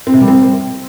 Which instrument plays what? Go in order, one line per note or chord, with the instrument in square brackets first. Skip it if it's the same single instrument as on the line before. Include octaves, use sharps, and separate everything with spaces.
[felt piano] C4
C3
G3
C4